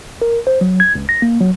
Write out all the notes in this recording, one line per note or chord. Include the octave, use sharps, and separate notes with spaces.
A#4
C5
F#3
G#6
C#2
A#6
A#3
F#3